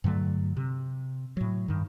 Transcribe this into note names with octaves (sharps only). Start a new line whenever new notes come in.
G2 D3 F#3 A3
C3
A2 F#3
G2 D#3